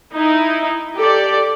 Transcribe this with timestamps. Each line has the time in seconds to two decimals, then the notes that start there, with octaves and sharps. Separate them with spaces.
0.14 D#4 E4
0.95 G4 A4 D5